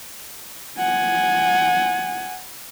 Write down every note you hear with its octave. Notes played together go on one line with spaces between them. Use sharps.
F#5 G#5